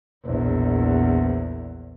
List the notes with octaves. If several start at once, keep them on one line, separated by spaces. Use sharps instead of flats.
A#1 E2